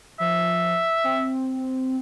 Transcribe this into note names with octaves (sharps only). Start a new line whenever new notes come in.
F3 E5
C4